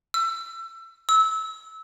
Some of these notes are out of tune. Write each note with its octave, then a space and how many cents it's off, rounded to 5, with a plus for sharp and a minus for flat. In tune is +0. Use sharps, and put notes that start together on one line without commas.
E6 +30
E6 -20